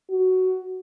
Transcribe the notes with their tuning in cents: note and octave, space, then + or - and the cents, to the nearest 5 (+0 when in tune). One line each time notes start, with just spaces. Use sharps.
F#4 +10